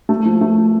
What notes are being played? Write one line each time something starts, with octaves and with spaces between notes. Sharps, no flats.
A3
F3
A3